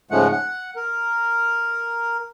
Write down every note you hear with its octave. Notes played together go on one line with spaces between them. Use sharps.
G#2 C#3 F3 G#3 A3 F#5
F#5
A#4